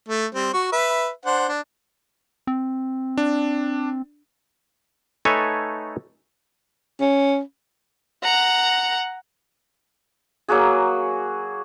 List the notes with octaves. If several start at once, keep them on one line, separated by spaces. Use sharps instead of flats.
A3
G3 C4 C5
F#4 C#6
B4 E5
D4 C5 F#5
D4
C4
D4
A3 D#4 A4 B4 C#5 G#5
C#4
F#5 A#5
F#3 A#3 F#4 G#4